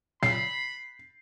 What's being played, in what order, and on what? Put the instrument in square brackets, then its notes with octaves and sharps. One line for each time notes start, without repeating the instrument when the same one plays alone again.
[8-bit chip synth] A#2 C#3 F#3 [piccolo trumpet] B5 [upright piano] C7